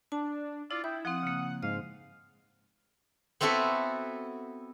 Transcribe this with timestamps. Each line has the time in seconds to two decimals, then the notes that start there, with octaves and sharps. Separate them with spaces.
0.12 D4 A5
0.71 E4 F4 D5
0.84 E4 G5 D#6
1.05 F3 C4 F#5 D#6
1.23 C#3 A#3
1.63 G#2 D#5 F5
3.41 B3 C4 E4 F#4 A4 B4